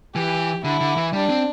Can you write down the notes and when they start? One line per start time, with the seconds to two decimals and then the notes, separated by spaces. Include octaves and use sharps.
0.15 E3 G4
0.64 D3 E4
0.81 D3
0.97 E3
1.13 G3 D4
1.30 C4